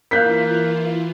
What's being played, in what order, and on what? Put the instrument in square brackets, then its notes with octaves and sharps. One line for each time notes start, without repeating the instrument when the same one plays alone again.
[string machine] E3 E4 F4 [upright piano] A#3 F5 [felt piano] F#6 G6 B6